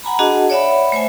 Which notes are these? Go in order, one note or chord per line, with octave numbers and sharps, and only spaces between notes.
F#5 G#5 A#5 B5
D4 F#4 G#4 D#5 F#5 A5
C#5 D5 E5 F#5 B5
A3 C5 E5 G#5